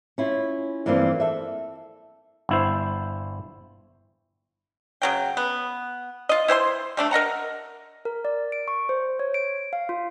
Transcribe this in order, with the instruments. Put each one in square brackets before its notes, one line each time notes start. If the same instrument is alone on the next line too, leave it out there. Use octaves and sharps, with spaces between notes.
[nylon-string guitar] C#4 E4 F4
E2 G2 E3 F3 A#3 C4
A4 E5
[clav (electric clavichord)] G1 E4 C5
[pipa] C#3 F#3 G5
B3
F4 D#5
E4 C5 G5 C6
G3 A3 D4
A#4 D#5 F#5 A#5
[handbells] A#4
D5
D7
C#6
C5
C#5
D7
F5
F4